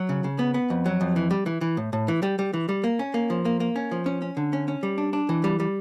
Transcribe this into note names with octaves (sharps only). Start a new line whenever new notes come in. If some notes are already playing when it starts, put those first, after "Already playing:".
Already playing: F#3
C#3
C#3
B3
B3
F2
F#3
F2
E3
G3
E3
E3
A2
A2
E3
G3
G3
E3
G3
A#3
C#4
A#3
F3
A#3
A#3
C#4
F3
C#4
C#4
D3
C#4
C#4
G3
D4
D4
E3
G3
G3